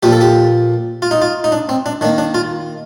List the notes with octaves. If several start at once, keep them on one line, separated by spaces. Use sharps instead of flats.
A#2 F3 A#3 G4
A4
G4
F4
D#4
F4
D#4
D4
C4
D4
D#3 A#3 D4
D4
F4